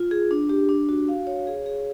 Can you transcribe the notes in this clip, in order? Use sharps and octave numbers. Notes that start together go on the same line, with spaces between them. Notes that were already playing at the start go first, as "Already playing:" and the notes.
Already playing: F4
G#4
D4
G4
D4
F#4
F5
C#5
G#4
G#4